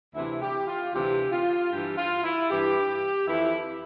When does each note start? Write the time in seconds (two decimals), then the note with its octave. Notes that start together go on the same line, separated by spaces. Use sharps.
0.15 D2 C3 E3 E4
0.41 G4
0.67 F4
0.93 D2 C3 E3 G4
1.32 F4
1.71 G2 E3 G4
1.98 F4
2.24 E4
2.49 G2 E3 G4
3.27 F2 E3 E4